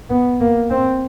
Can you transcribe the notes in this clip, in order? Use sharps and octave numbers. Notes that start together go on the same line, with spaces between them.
B3
A#3
C4